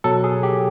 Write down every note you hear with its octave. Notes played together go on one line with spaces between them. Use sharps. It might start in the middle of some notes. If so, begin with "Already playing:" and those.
B2 F#3 A4
G#4
G4